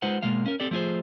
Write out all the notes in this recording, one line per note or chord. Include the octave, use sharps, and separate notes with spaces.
G#3 D#4 F4 B4 C5 F#5
B2 G#3 A#3 F5
C#4 A#4
C4 G4 A4 D5
F3 A3 F4 G#4 C5